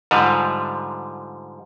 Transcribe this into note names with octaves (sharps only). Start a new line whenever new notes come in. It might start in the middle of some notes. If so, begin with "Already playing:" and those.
G#2 D3 F3 G3